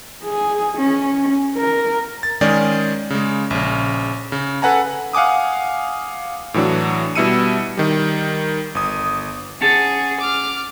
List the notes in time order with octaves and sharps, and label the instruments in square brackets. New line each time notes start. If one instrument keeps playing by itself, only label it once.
[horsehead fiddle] G#4
C#4
A#4
[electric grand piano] A6
D#3 G#3 C#4 G#4 D5
C#3 G#3
A#1 C#3
C#3
A4 B4 F#5 G#5 A#5
F5 F#5 G#5 D6 D#6
A2 E3 F#3 D4
B2 G3 E4 E6 C#7 D#7
D#3 G3
G1 D#6
[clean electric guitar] C#4 F#5 A5 [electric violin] G#4
[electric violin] D6 F6